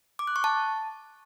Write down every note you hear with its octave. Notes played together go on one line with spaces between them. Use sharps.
D6
F#6
C#6
A5